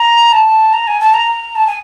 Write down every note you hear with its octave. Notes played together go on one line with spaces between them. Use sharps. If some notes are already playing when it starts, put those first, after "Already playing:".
Already playing: A#5
A5
A#5
G#5
A5
A#5
A5
G#5